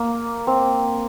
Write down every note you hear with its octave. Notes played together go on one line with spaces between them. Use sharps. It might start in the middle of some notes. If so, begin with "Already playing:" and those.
Already playing: A#3
C4